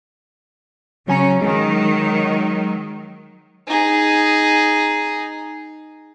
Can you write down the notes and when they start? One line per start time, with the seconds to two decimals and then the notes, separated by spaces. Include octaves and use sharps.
1.08 C#3 F#3 C#4 G#5 A#5
1.42 D#3 F#3 G#3
3.68 D#4 G#4